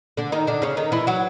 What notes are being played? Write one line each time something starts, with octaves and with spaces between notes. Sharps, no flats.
D3 D4
D#3 D#4
D3 D4
C#3 C#4
D#3 D#4
E3 E4
F#3 F#4